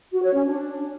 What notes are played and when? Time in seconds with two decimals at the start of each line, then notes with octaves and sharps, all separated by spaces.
0.12 F#4
0.23 C#5
0.34 C#4
0.45 D4